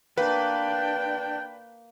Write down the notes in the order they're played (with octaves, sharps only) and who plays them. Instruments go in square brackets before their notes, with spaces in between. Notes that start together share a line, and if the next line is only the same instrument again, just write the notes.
[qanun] A#3 [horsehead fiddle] D4 G5 [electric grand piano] B4